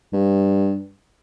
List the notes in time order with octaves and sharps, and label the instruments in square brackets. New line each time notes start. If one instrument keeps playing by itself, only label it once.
[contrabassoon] G2